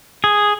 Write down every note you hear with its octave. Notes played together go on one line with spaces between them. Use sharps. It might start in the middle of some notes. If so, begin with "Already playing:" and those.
G#4